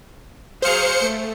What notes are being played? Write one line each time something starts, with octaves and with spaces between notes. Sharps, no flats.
F#3 G#4 C5 F5 C#7
A3